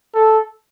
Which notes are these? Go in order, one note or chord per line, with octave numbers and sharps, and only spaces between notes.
A4